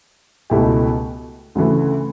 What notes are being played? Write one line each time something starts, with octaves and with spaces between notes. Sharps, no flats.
C#2 B2 A3 E4 G4
D2 C#3 E3 A3